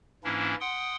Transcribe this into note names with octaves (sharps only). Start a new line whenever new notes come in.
G#2 E3 A#3 C#4 D4 E4
F#5 G5 C6 D#6